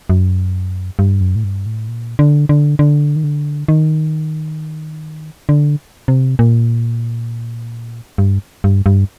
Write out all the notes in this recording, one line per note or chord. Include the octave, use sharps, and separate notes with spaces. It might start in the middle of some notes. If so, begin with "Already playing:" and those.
F#2
G2
F#2
A2
G2
A2
A#2
D3
D3
D3
D#3
D3
D#3
D3
C3
A#2
G2
G2
G2